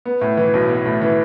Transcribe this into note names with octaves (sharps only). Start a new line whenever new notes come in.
B3
A2
E3
B1
B3
A2
E3